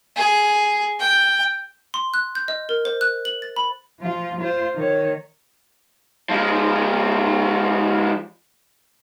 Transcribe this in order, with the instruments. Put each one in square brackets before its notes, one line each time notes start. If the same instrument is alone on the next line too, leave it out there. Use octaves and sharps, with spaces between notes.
[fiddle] G#4
G5
[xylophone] C6
F#6
G6
D#5
A#4
C5
F#6
F#7
A6
B5
[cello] F3 F4
F4 C5
D#3 C#5
[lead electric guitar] F3 G#3